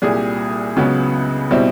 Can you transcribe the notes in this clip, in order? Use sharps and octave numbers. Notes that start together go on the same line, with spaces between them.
C2 A#2 G3 G#4
C#2 C#3 F#3 B3
B2 G3 C4 E4